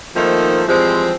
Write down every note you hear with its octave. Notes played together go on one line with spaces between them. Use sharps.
D#3 F3 A3 A#3 C4 D#4
E3 F3 G3 G#3 C4